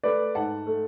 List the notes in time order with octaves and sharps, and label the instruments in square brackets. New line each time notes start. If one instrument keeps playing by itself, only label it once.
[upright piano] A3 B4 D5
G#2 F#5 A5
A3